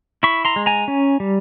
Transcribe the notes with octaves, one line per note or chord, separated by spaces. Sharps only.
E4 B5 C#6
A#5 C6
G#3
G#5 A#5
C#4
G3